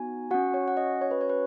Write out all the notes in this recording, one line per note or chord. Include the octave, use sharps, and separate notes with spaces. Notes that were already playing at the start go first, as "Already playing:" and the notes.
Already playing: B3 D#4 F#4 G#5
C#4 F#4 F#5
C#5
F#5
D#5
C#5
B4
C#5
B4